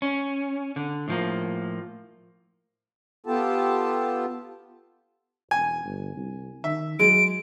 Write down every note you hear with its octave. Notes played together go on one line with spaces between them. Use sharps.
C#4
D3
A2 F3 A#3
B3 F4 G4 A4 A5
E1 G#5
G1
C2
D#3 E5
F#3 G#3 D7